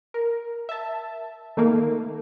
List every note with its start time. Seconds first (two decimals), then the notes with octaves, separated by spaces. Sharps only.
0.14 A#4
0.69 E5 A5
1.57 D#3 A3 A#3